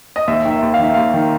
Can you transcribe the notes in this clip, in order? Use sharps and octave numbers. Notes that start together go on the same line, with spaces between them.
D#5
D#2 E5
D#3
E5
D#2
F5
D#3 E5
D#2 F5
D#3